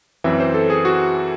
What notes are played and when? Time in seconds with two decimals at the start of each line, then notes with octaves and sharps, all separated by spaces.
0.24 F#2 E3 C4 E5
0.40 C5
0.54 A4
0.70 G#4
0.85 F#4